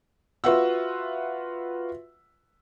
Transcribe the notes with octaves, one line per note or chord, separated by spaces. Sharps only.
F4 F#4 B4 E5 F#5 E6